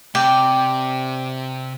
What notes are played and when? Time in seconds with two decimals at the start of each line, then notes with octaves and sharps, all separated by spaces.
0.15 C3 D5 G5